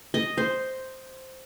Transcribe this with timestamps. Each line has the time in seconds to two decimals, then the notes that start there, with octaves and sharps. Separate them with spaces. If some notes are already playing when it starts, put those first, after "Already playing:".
0.14 D#5
0.38 C5